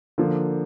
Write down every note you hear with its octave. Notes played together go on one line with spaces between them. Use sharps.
D3 F3 A#3